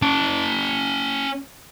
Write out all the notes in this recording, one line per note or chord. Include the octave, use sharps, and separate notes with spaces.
C#4 A5